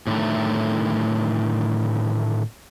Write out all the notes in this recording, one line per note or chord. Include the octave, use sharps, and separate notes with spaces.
A2 D3 D#3 A3